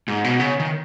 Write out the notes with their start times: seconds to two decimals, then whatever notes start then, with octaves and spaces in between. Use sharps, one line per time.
0.08 G#2
0.24 B2
0.40 C#3
0.60 D#3